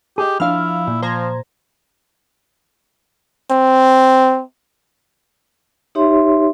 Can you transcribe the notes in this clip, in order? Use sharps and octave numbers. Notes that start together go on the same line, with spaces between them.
G4 G#4 D#5
F3 D4 E4 F5 F6
A#2
F3 C5 A#5 G#6
C4
D#4 G4 C#5 E5 C6